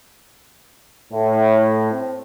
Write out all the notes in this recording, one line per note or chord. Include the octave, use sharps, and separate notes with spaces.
A2
C4